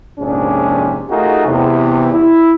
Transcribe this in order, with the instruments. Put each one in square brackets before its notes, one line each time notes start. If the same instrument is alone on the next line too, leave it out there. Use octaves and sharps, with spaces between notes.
[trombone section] A#1 F2 G#2 C3 C#4 D4
A3 D#4 F4 F#4 G#4 A#4
E2 C3
E4